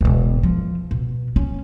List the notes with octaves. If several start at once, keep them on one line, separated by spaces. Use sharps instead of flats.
E1 B2
F3
B2
C#4